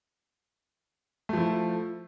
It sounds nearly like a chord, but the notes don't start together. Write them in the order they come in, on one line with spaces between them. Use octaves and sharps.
A3 F3 E4